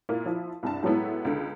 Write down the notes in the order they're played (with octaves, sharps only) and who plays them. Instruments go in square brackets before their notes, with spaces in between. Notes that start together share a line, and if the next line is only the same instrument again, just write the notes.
[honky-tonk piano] A#2 A#3 E4
F3 E4
C2 G2 A5
A2 F#3 G#3 B3 E4
C#2 D3